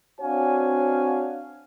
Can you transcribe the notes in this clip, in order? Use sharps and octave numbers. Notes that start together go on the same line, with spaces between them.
C4 D4 F#4 C#5 F5 G#5